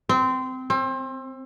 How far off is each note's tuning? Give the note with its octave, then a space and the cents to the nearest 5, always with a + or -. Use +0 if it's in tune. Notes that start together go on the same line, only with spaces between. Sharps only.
C4 -20
C4 +30